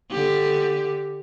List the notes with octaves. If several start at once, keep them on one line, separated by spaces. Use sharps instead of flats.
D3 G4